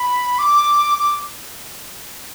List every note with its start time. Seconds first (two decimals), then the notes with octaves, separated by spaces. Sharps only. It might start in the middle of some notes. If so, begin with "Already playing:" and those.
Already playing: B5
0.39 D6
0.98 D6